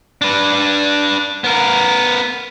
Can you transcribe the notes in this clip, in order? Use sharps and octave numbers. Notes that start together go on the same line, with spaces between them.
D4 B4
B3 A#4